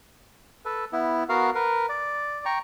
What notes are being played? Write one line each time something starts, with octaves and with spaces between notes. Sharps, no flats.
A4 B4
B3 E4
B3 F#4 A#4 F5
A#4 B4
D5
G5 A#5 C#6